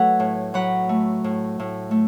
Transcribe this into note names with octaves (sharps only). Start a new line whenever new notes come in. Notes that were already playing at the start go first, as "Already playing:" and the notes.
Already playing: F#3 A3 A4 B4 C#5 E5 F#5
A2
F#3 F#5 B5
A3
A2
A2
A3